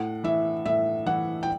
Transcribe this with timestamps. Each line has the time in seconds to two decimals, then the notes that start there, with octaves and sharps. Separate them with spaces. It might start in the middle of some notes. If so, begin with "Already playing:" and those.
Already playing: A2 F#5
0.24 E3 E5
0.65 A2 E5
1.06 E3 F#5
1.43 G5